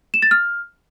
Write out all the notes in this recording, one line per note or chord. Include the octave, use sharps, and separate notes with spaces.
E7
A6
F6